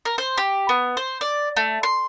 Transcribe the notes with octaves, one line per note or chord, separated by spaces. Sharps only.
A#4
C5
G4
B3
C5
D5
A3
C6